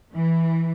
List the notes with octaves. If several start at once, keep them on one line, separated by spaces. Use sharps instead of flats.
E3